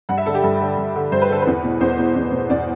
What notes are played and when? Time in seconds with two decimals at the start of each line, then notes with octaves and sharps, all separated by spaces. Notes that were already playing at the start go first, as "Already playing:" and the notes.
0.09 G2 F#5
0.18 E5
0.26 D3 A4
0.34 G4
0.43 G2 A4
0.61 D3
0.78 G2
0.96 D3
1.12 G2 C5
1.22 B4
1.30 D3 A4
1.42 E2 B4
1.63 B2
1.81 E2 C5
1.98 B2
2.16 E2
2.32 B2
2.50 E2 D5